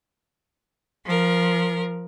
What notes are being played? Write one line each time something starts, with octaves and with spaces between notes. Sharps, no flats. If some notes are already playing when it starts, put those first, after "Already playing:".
F3 A#4